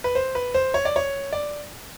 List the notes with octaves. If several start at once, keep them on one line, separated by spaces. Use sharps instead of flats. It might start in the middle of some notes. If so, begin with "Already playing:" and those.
B4
C5
B4
C5
C#5
D5
C#5
D5